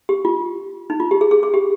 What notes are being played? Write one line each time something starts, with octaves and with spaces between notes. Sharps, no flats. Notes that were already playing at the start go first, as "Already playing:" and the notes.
G4
F4
D#4
F4
G4
G#4
G#4
G#4
G4